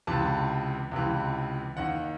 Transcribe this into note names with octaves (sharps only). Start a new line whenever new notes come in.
C#2 C3 E3 A5
C#2 C3 E3
D#2 D#3 F#5